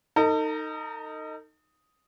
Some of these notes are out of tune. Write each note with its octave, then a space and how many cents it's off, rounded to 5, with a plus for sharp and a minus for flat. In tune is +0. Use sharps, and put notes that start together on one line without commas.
D#4 +0 A4 +45